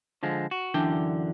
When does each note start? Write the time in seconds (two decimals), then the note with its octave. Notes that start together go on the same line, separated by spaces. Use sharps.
0.23 D3 F3 G#3
0.51 F#4
0.74 F#2 D3 E3 D4 G5